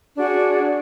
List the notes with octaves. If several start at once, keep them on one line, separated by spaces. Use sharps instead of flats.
D4 F#4 G#4